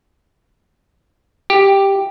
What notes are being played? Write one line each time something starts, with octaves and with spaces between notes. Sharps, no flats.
G4